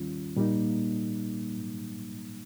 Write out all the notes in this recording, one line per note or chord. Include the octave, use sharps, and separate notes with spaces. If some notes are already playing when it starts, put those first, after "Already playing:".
Already playing: D#2 D#3 G3 C#4 F4
A#2 G3 A#3 D#4